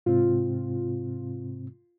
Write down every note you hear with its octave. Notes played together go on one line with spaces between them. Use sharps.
G#2 C3 C4 F4